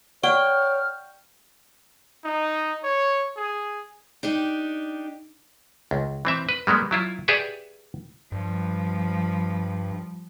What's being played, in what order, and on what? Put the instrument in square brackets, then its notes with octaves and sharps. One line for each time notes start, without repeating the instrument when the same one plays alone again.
[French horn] C#5 [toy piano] D5 F#5 C#6 [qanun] G5 [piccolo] F6
[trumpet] D#4
C#5
G#4
[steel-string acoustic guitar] D4 D#4 G4
[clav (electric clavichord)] C#2
E3 C4 E5
B4
G3 G#3 A#3 B3
F#3 E4 F4
G4 G#4 B4 D5 E5 F#5
[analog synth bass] G2 [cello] F3 G3